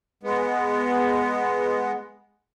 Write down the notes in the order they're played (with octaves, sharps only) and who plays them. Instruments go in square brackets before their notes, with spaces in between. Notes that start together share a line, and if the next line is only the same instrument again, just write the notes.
[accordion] G#3 B3